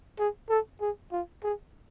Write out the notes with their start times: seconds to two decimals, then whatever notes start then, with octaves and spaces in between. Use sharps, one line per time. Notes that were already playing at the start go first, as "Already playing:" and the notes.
0.19 G#4
0.49 A4
0.81 G#4
1.12 F4
1.44 G#4